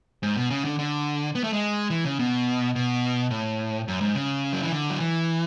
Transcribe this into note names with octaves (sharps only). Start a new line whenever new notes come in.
G#2
B2
C#3
D3
D3
B3
A3
G#3
E3
C#3
B2
B2
A2
F#2
G#2
C#3
F#3
E3
D3
F#3
E3